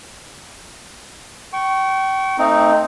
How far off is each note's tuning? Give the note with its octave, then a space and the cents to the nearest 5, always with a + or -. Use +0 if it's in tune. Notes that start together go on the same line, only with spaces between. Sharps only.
G5 -35 C#6 +0
A3 +30 C4 +0 D#4 +0